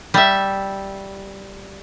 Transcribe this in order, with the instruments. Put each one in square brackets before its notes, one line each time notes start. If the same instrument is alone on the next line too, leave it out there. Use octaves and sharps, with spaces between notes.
[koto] G3 E5